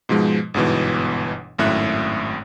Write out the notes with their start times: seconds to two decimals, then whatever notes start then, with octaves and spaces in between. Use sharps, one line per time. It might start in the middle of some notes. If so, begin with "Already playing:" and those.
0.09 G#2 B2 F3 G#3
0.54 G1 G#2 B2 E3
1.59 G#1 F#2 A2 E5 F#6